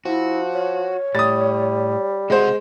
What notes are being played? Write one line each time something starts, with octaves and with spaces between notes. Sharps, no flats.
F3 E4 F#4
C#5
A2 G3 D#6 A6
C3 G#3 F#4 A4 C5 F#5